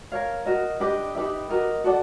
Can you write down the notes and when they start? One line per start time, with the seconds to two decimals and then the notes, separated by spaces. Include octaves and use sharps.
0.12 A#4 C#5 F5
0.46 F#4 A#4 D#5
0.80 D4 G4 B4 D#5
1.15 D#4 G4 B4 E5
1.49 F#4 A#4 D#5
1.84 F#4 A4 D5 F#5